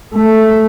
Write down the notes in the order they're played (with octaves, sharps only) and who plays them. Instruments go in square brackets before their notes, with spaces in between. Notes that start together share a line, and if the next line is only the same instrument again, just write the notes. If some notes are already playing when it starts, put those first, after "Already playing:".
[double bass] A3